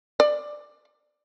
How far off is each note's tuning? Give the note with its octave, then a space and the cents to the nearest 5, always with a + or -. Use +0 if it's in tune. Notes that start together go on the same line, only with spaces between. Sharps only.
D5 +10